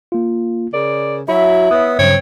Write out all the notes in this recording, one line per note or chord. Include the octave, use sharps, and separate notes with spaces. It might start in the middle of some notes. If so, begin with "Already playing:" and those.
A#3 F4
C#3 A#4 D5
F#3 E4 F#4 E5 B5
B3 C#5 D#6
G2 C#3 F#3 C4 C#5